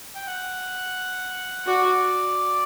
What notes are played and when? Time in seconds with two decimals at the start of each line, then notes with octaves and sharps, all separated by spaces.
0.15 G5
0.27 F#5
1.66 F#4 D5